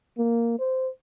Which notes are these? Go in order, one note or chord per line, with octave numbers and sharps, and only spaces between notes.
A#3
C5